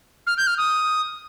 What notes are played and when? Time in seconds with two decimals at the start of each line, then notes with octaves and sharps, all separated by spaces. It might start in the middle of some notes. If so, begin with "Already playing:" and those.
0.27 F6
0.37 G6
0.47 F6
0.58 D#6